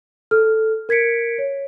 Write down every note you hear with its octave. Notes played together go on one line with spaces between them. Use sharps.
A4 F6
A#4 G#6 B6 C#7 D7
C#5